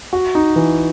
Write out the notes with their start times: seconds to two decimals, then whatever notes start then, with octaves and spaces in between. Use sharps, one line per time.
0.13 F#4
0.35 D#4
0.56 E3